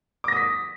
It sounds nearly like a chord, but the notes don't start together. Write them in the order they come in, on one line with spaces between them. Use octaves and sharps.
D6 A#6 D#6 B6